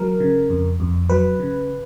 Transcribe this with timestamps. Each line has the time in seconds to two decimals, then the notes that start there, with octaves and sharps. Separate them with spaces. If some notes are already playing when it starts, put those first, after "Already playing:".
Already playing: F#3 A#4
0.20 C#3
0.50 F2
0.80 F2
1.09 F#3 B4
1.39 C#3